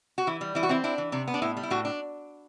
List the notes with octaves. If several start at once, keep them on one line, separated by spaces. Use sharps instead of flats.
F#4
E3 E4
G3
E3 E4
F#4
C4 E4
D4 E4
E3
C3 D4
B3
D4
A2 E4
G3
E4
A2 D4 F#4
D4